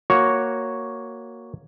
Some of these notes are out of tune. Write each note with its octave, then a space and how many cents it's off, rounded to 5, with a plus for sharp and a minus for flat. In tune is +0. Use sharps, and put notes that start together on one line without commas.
A#3 +0 F#4 +0 C#5 +0